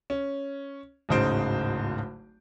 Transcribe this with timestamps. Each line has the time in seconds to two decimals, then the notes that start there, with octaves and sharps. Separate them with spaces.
0.10 C#4
1.09 D1 G#1 C#3 D#4 C5 D7